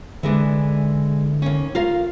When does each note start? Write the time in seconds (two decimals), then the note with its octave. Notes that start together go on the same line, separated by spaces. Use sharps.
0.23 D3 E3 G#3 D4
1.42 D#2 C#4
1.75 F4 A#4 F5